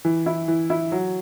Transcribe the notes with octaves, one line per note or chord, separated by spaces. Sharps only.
E3
E4
E3
E4
F#3